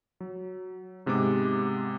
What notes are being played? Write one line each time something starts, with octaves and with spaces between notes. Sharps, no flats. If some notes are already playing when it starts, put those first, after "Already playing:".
F#3
G#2 C3 G#3 B3 D6